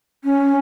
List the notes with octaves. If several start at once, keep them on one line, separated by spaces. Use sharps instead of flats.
C#4